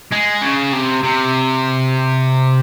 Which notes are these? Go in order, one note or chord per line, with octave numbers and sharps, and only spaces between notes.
G#3
C#3
C3
C3